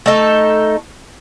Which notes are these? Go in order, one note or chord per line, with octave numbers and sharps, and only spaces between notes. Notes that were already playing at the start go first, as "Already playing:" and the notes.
A3 D#4 A4